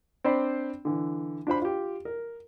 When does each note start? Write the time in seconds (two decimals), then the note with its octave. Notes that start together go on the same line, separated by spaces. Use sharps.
0.24 C4 D4 C5 D5 B5
0.85 D3 E3
1.47 D4 F4 C5 B5
1.62 F4 G4
2.05 A#4